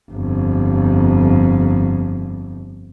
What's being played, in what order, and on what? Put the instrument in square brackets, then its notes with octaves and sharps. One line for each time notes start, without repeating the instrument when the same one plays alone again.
[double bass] G1 F2